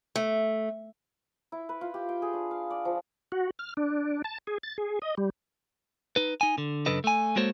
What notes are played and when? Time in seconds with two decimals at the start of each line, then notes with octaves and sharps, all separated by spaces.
0.16 A3
1.52 E4
1.69 B4
1.81 F4
1.94 G4
2.09 G5
2.22 G#4
2.33 D4
2.51 F5
2.70 D5
2.85 F3
3.32 F#4
3.59 F6
3.77 D4
4.24 A5
4.47 G#4
4.63 A6
4.78 G#4
5.02 D#5
5.18 G3
6.16 D#4 B4
6.41 D#4 G#5
6.58 D3
6.86 F#2 C#3 D4 A4 B4 D#5
7.04 A3 G#5
7.36 G#3 A#3 F#4 A4 C5 C#5